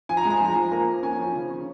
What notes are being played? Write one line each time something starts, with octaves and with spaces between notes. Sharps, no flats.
F3 G#5
A#5
G#3 G#5
A#5
G#5
F3 A#5
G#5
F3
A#3 A#5
A#3
C#4 G#5
F3
C#3
C#4